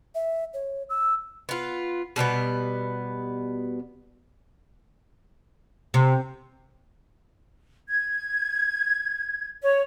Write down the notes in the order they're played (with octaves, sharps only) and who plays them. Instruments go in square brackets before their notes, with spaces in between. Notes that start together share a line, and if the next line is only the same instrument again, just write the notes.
[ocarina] E5
C#5
E6
[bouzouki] B3 F4
B2 G3 A#3 B3
[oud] C3
[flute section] G#6
C#5